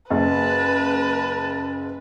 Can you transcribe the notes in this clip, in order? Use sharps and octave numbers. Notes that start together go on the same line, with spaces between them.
F#1 B4 A5